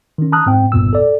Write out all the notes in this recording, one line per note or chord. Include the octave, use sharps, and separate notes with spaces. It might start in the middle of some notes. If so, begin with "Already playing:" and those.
D#3 C#4
A5 A#5 D#6 F6 F#6
G#2 C4 G5
G1 E2 G2 A#2 B3 E6
A4 D5